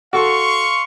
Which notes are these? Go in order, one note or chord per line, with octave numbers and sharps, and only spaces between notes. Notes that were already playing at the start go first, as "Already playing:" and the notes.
F#4 A4 F5 C6 C#6